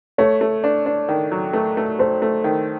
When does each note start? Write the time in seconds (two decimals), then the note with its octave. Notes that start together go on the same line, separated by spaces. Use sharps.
0.18 A3 C#5
0.41 A3
0.64 D4
0.86 D4
1.09 D#3
1.32 F#3
1.53 A3
1.77 A3
1.99 A3 C5
2.22 A3
2.44 D#3